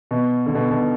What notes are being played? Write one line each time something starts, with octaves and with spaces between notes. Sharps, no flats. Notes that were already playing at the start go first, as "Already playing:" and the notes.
B2
D3
B2
B2